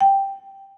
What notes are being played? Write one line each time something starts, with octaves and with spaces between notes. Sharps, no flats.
G5